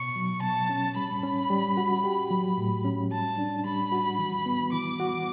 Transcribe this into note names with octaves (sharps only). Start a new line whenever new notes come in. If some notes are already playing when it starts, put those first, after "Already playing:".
Already playing: B2 C#6
F#3
B2 A5
C#4
G3 B5
C#4
G3
F#4
G4
F#3
A2
C#4
G3 A5
D4
G3 B5
F#4
E3
B3
E3 D6
F#4